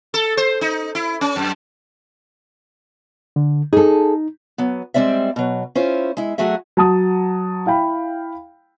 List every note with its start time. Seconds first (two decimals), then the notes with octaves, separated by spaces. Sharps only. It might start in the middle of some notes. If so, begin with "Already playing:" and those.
0.14 A4
0.37 C5
0.61 D#4
0.95 E4
1.21 C#4
1.36 F#2
3.36 D3
3.73 D#4 G#4 A4
4.58 F#3 B3
4.94 G3 G#3 C4 D5 E5
5.36 B2 F#3
5.75 C#4 E4 F4 C5
6.17 G#3 E4
6.38 F#3 A3 F#4 G#4 E5
6.77 F#3 A5 D#6
7.66 E4 F5 G5 B5